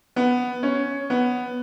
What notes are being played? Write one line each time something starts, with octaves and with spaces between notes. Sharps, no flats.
B3
C#4
B3